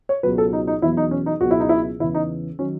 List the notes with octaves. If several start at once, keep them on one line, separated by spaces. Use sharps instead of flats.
C#5
C#2 B2 F#3 B4
A4
D#4
D#4
E2 B2 F#3 E4
D#4
C#4
D#4
C#2 B2 F#3 F#4
E4
D#4
E4
E2 C#3 E3 E4
D#4
D#3 F#3 C#4